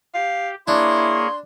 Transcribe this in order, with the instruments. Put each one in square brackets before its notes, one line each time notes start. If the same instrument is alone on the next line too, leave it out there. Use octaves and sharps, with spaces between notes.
[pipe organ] G4 [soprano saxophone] F5
[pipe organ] A#3 G#4 C#5 [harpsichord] D4 [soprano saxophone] E4 [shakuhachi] C6